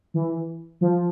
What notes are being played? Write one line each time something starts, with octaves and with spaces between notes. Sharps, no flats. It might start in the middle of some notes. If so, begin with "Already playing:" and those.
E3
F3